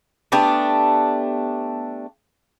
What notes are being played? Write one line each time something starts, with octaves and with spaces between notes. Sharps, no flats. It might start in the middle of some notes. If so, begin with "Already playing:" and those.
A3 B3 D4 G4